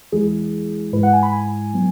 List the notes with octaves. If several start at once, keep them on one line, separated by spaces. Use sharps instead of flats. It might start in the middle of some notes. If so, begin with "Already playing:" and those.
E2 E3 G#3 E4 G#4
G#2 G#3 E4 B4
F#5
G#5
B5
G#5
F#3 B3